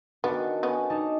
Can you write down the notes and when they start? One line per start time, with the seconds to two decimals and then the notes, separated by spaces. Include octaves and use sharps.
0.24 D#3 B3 D4 F#4 A4 A#4 G#5
0.63 B3 C#4
0.90 D#4 G4 D#5 A5